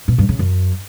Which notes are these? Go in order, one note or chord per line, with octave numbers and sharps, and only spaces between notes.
B2
G2
C#3
F#2